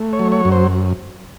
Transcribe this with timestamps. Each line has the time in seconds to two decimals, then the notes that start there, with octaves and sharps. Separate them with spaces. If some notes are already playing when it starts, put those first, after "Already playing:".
Already playing: A3
0.13 C#5
0.19 F#3
0.32 C#5
0.45 F#2
0.52 C5